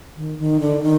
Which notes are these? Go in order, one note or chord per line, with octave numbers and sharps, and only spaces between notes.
D#3
D#3
D3
D#3